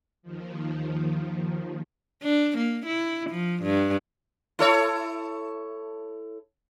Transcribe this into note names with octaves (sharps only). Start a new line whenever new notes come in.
D#2 D#3 F3
D4
A#3
E4
F3
G2
E4 A4 C#5